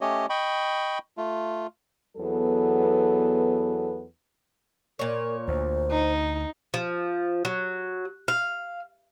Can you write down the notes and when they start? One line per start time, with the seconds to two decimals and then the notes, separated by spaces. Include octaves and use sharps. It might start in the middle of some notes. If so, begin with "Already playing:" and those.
0.01 A3 C#4 G4 C#5 D#5
0.30 D#5 G5 B5 C#6
1.17 A3 F4
2.17 E2 F#3 B3 A4
4.99 A#2 A#4 C#5
5.48 D2 C5
5.91 D#4
6.74 F3
7.45 F#3
8.28 F5